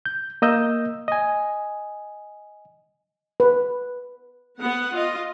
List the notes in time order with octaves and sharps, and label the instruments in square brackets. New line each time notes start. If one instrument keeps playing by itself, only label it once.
[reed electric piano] G6
A#3 D#5 E6 G6
D#5 G#5
[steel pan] B4
[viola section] B3 F#5
F4 D#5